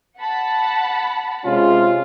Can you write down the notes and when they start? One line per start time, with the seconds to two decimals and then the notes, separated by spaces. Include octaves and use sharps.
0.18 F#5 A5 B5
1.45 C3 G#3 C#4 F4